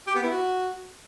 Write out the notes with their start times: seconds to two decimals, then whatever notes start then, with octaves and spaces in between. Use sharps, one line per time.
0.07 G4
0.15 B3
0.23 E4
0.31 F#4